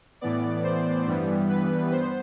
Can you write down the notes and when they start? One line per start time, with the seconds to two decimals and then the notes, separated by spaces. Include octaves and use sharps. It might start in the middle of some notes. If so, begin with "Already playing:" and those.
0.21 A2 E3 B3 D5
0.64 C5
1.07 G2 E3 G3 B3
1.49 B4
1.92 B3 C5